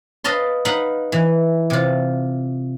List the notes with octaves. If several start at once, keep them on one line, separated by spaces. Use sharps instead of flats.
B4 D#5 F5 A5 C6
D#4 B4 F5 F#5 B5
E3
C3 F4